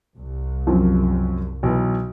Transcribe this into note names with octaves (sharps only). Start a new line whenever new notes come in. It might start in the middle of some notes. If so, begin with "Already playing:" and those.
C2
F#2 F3 C4
B1 E3 B4